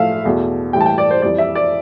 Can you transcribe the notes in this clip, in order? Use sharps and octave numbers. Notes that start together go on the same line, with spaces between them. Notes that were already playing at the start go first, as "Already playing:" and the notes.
Already playing: A2 F3 A3 E5 F5
E2 B2 A3
A2 E3 G3 G5
A5
G5
D5
C5
F2 E3 G3 D5
E5
D5